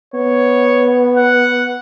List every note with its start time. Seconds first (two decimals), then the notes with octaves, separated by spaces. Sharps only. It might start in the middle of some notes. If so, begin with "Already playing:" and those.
0.14 B3 C#5
1.17 F#5